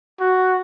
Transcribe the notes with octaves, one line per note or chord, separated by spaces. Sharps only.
F#4